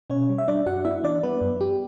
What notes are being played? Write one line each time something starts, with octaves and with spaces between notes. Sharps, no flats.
B2 C#4 C#5
G3
E5
G3 D4 D5
F#2 F#4 F#5
B3 E4 E5
E3 D4 D5
G3 B3 B4
F#2
B3 G4